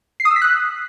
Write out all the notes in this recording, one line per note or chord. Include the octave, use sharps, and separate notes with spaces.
C7
D#6
E6
B6
F#6